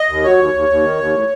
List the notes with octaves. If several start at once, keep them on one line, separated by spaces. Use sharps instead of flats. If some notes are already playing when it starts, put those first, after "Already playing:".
Already playing: D#5
D#2
F#3 C#5
D#2
D#2
D#2
D#3
D#2
A2